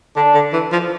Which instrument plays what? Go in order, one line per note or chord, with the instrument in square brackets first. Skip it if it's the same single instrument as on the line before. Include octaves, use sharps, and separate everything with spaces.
[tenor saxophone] D3 [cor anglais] D4
[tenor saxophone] D3
E3
F3